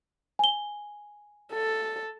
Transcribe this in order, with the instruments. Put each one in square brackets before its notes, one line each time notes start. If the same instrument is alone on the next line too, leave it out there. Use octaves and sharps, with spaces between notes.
[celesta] G#5 G7
[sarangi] A4